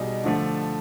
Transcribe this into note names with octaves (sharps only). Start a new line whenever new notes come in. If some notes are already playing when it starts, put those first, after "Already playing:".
Already playing: B2 G3 D#4 G#4
D3 F3 A3 D4